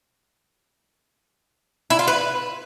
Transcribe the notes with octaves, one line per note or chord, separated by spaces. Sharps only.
E4
F4
B4